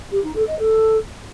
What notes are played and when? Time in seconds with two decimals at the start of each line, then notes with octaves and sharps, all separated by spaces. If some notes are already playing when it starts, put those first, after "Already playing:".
0.11 G4
0.23 D#4
0.35 A4
0.47 D#5
0.59 A4